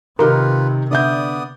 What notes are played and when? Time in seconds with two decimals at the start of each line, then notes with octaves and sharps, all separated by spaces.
0.19 C3 D#3 D#4 F4 G4 A#4 B4
0.91 D3 B3 D5 E5 D#6 G6